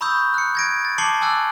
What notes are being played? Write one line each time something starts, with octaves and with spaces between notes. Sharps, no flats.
A#5 B5 C#6 D#6 E6 G6
F#6 C#7
G#6 A#6 D7
A6
A5 D6 C7 C#7 F#7 G7
G#5 D6 E6 F#6 A6